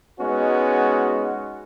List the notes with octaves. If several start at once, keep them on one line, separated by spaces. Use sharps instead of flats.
G#3 B3 C#4 D#4 F#4